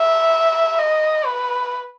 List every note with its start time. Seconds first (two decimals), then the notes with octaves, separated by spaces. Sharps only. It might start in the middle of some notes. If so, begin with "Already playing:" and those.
Already playing: E5
0.79 D#5
1.26 B4